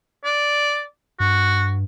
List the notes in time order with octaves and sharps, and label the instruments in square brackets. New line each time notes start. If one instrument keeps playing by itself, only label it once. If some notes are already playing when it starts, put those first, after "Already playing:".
[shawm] D5
[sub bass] G2 [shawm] F#4